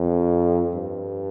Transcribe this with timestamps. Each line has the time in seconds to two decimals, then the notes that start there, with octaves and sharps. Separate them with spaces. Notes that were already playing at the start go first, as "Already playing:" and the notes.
Already playing: F2
0.74 G2